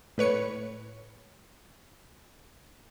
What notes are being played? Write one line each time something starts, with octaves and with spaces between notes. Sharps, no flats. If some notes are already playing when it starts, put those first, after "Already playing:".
A2 B4 C#5 C#7